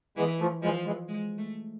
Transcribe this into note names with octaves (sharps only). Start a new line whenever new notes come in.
E3 G#3 B3
F3 A3
E3 F3 G#3
E3 G#3
G#3
A3